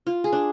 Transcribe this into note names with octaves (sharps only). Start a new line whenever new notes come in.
F4
G#4
D4